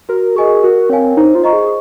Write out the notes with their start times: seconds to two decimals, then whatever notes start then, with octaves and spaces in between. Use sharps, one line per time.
0.09 F#4 A#4
0.36 G#4 A#4 D#5 G#5 C#6
0.63 F#4 A#4
0.90 C4 C#5 F5 G#5
1.17 D#4 C5
1.35 F4
1.44 D#5 A#5 C#6
1.53 G#4